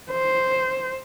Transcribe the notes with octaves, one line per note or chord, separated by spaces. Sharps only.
C5